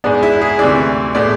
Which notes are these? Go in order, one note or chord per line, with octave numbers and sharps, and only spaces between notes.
G#2 G#3 B3 D4
E4
G#4
D2 C3 E3 D5
A2 G#3 B3 D5